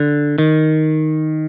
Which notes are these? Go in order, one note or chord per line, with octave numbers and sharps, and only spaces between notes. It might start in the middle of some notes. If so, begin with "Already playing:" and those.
Already playing: D3
D#3